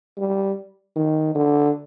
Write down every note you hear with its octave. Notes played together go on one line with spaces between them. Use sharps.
G3
D#3
D3